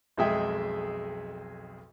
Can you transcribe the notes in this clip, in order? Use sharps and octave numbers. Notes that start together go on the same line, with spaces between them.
B1 F2 G#3 G#4 E5 G5